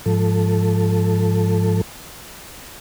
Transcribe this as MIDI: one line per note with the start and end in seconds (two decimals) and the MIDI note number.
0.06 1.81 44
0.06 1.81 53
0.06 1.81 69